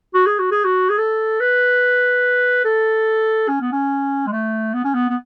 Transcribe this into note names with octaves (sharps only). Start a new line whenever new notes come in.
F#4
G#4
F#4
G#4
F#4
G#4
A4
B4
A4
C#4
B3
C#4
G#3
A3
B3
C#4
B3
B3